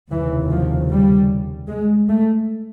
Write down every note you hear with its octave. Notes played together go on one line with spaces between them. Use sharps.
F1 D#2 C#3 E3
F3
G3
G#3
A3